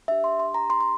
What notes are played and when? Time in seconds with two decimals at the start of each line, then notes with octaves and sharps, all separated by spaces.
0.08 D4 G4 E5
0.24 C6
0.39 C6
0.54 A#5
0.70 C6
0.80 C6